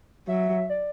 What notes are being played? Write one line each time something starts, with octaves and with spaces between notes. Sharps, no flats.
F#3 E5
D5